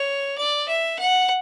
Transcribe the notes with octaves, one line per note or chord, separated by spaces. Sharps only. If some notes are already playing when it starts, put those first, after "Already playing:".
Already playing: C#5
D5
E5
F#5